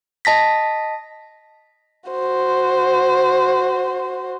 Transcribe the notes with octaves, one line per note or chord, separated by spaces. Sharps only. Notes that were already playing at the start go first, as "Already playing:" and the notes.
D#5 A5 A#6 B6
F#4 C5